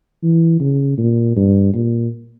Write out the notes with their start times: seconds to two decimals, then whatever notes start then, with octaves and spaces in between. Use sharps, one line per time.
0.23 E3
0.60 C#3
0.97 A#2
1.36 G2
1.74 A#2